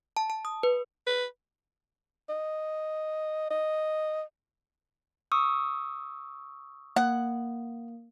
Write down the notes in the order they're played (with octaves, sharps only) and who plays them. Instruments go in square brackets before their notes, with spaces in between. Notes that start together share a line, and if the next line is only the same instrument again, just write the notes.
[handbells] A5
A5
D#6
B4
[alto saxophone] B4
D#5
D#5
[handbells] C#6 D#6 E6
[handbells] A#3 [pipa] F#5